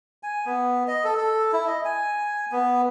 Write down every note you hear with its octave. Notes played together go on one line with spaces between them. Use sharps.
G#5
B3
D#5
A4
A4
E4
D#5
G#5
B3